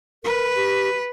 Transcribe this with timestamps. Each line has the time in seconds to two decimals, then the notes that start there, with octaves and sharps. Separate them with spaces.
0.24 A#4 B4
0.56 G4